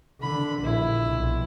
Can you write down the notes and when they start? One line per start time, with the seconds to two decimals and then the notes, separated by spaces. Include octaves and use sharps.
0.22 D3 B5
0.63 A#1 E4
1.05 B1